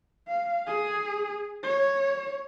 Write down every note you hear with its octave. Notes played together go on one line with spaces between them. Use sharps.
F5
G#4
C#5